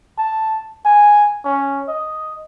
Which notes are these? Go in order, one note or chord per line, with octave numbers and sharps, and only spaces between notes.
A5
G#5
C#4
D#5